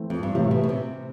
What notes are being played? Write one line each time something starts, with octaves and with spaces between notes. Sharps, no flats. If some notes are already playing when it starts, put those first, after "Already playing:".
Already playing: E3 A3 C4
F2
G2
A2 C3 E3 A3
B2
B2
C3